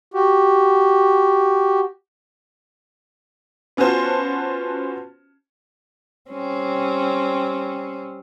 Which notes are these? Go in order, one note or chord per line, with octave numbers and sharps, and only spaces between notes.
F#4 G4
B3 C#4 F4 F#4 C5 A5
G3 C4 C#4